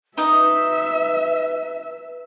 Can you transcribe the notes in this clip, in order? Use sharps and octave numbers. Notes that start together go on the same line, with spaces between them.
D#4 B4 D#5 E5